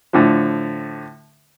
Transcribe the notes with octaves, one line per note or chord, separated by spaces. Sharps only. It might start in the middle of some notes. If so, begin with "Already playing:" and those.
A2 D3 F3